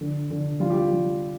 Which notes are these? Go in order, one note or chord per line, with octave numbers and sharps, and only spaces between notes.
D3
D3
G3 F4
G4
F4
G3